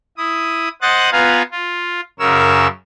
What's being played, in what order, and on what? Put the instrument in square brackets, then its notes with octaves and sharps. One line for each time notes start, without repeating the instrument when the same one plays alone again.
[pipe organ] E4 D#6
C5 D#5 F#5 D#6 F#6 A6
B3 F4 B4 F5 G#5 A#5
F4
F#2 C#3 A#4 C#5 E6